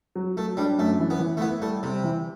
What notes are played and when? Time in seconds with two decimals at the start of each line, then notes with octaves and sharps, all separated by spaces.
0.16 F#3
0.37 F#3 A3
0.57 G3 D4
0.78 F#2 A3
1.00 E3
1.10 B3
1.20 E3
1.37 A3
1.40 B3 E4
1.62 G3 A3
1.82 C3 G3
2.04 E3